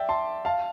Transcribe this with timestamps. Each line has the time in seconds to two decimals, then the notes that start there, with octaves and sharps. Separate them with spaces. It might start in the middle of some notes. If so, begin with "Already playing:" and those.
Already playing: D5 E5 G5
0.09 A5 C6
0.45 F5 A5